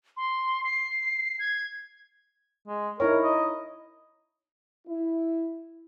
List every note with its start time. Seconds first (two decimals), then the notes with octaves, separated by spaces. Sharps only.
0.17 C6
0.65 C7
1.39 G#6
2.68 G#3
3.00 D#4 E4 A#4 C#5
3.24 D#5
4.87 E4